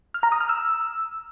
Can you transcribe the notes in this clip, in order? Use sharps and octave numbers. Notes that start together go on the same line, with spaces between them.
F6
A#5
D#6
F6
E6